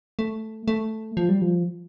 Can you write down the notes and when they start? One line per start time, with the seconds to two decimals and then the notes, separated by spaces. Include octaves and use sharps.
0.19 A3
0.68 A3
1.17 F3
1.29 G3
1.42 F3